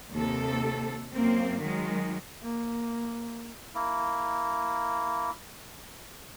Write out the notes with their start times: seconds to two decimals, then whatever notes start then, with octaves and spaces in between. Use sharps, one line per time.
0.12 D#2 C3 A4
1.15 F#2 A#3 C4
1.60 D#3 F#3 G#3
2.42 A#3
3.75 A#3 E4